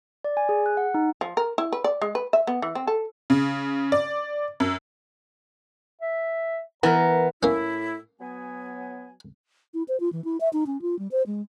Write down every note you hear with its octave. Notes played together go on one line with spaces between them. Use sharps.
D5
G#5
G#4
F#6
F#5
D#4
F3
A#4
E4
B4
D5
G#3
B4
E5
B3
E3
C4
A4
C#3
D5
F#2
E5
E3 B3 A#4 A#5
A2 A#3 C#4 E4
F#3 B3 G#5
E4
C5
F4
E3
E4
E5
D#4
C#4
F4
G3
C5
G#3